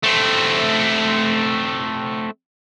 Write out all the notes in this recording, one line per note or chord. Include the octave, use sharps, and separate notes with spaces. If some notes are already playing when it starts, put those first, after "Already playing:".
A3 C4